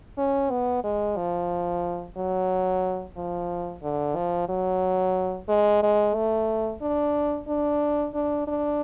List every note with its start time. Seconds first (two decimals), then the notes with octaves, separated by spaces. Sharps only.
0.17 C#4
0.51 B3
0.84 G#3
1.17 F3
2.17 F#3
3.17 F3
3.83 D3
4.16 F3
4.49 F#3
5.49 G#3
5.83 G#3
6.15 A3
6.82 D4
7.48 D4
8.14 D4
8.47 D4